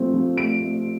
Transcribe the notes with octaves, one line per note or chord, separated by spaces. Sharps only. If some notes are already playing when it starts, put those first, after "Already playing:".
Already playing: F3 A3 C4
F3
A3 D7
A3